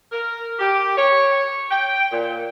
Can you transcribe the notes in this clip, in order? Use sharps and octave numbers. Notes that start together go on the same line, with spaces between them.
A#4
G4
C#5
G5
A#2